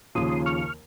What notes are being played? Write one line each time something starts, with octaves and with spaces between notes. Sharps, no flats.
D#2 C#3 F3 A#3 C6 D#6
C#6 F6